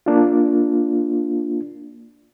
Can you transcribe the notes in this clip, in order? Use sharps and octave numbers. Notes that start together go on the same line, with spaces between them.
A#3 D4 F4